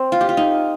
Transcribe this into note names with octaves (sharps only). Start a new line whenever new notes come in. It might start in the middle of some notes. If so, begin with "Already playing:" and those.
Already playing: C4
F4
G4
F4
D#4